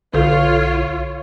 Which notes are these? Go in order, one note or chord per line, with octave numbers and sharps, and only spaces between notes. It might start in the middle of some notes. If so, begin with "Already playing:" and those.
B1 D3 F4 A4 C#5